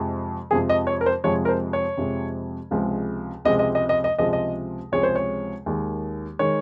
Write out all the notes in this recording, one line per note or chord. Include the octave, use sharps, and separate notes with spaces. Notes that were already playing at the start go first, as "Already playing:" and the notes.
Already playing: F2 C3 F3 G#3
F2 C3 F3 G#3 G#4
D#5
C#5
A#4
C5
F2 C3 F3 G#3 C#5
A#4
C5
C#5
F2 C3 F3 G#3
C#2 C3 F3 G#3
C#2 C3 F3 G#3 D#5
D#5
D#5
D#5
D#5
C#2 C3 F3 G#3 D#5
D#5
C#2 C3 F3 G#3 C#5
C5
C#5
D#2 D#3 G#3
D#3 G#3 C#5